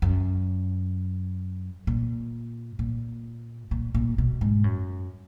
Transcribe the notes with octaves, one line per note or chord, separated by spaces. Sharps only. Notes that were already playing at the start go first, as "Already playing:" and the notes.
F#2
A#2
A#2
A#2
A#2
B2
G#2
F#2